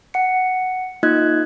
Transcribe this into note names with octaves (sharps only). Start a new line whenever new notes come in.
F#5 C#7
A#3 D#4 F4 D#5 F#6 G#6